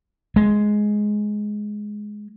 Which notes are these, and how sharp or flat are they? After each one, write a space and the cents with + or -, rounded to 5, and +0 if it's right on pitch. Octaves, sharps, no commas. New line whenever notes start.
G#3 +10